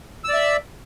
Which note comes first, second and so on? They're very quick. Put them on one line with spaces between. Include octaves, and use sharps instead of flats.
E6 D5 E5